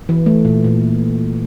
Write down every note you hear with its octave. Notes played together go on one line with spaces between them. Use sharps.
E3
A3
A#2
A#2